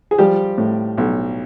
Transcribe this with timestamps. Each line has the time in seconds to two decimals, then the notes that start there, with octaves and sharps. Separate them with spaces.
0.11 G#4
0.18 F3 G3 G4
0.58 A2
0.98 B1